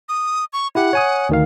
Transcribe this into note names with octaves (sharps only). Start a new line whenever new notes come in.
D#6
C#6
E4 G4 F#5
C#5 G#5 D#6
D2 D#3 F5